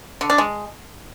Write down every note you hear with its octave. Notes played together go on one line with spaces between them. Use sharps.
D3
D4
G#3